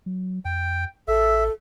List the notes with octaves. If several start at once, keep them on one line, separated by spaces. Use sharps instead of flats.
F#3
F2 G5
A1 A4 E5